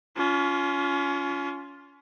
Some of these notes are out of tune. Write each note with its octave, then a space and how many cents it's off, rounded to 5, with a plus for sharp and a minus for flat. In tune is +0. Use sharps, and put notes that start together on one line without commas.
C#4 +30 F4 +0